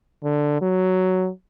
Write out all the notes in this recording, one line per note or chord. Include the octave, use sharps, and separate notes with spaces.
D3
F#3